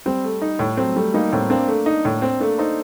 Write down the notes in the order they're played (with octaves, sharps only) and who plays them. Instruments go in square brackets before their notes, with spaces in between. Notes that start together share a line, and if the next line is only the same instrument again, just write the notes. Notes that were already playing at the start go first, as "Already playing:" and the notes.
[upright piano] G3 [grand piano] C4
[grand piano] A3
D#4
A2
[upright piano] F#3 A3 [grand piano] C4
[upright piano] G3 [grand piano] A3
[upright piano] G3 A#3 [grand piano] D#4
[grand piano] A2 [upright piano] A3 C4
[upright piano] A#3 D4 [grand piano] C4
[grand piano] A3
D#4
A2
C4
[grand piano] A3 [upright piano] A#3 D4
[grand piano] D#4 [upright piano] A4 C5